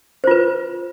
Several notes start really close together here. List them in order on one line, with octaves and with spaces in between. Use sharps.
C5 F4 B4